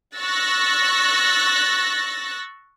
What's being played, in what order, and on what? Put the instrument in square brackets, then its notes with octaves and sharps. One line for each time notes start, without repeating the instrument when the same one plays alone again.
[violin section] C#6 E6 F#6 A6 A#6